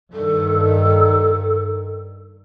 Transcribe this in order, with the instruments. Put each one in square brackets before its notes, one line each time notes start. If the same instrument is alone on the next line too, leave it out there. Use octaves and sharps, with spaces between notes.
[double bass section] G2 D#3 [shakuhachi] A4